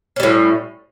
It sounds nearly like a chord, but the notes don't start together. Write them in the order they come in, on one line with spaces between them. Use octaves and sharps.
C#4 G3 A2